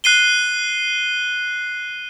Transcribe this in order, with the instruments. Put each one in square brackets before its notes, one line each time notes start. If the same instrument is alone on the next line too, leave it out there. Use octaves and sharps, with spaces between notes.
[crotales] F#6 C7 D#7 G7